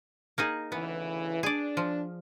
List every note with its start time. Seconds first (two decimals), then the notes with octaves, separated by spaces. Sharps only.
0.38 A#3 D#4 G#4
0.72 D2 C#3 E3 B3
1.43 D4 G#4 D5
1.77 F3